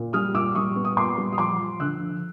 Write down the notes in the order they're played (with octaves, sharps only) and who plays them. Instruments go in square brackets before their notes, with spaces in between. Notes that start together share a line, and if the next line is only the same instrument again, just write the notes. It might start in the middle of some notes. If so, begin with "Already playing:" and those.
Already playing: [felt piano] A#2
G3 D#6 F6
A#2 D6 E6
G3 C#6 D#6
B3
D#6
A#2 C6 D6
G3
D#6
F3 C6 D6
F3
D3 E6 F#6
F3